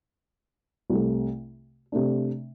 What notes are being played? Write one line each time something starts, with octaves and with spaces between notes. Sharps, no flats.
C2 C3 A3
C3 A3 D4